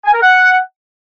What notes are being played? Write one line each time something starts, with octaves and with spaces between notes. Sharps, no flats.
G#5
A#4
F#5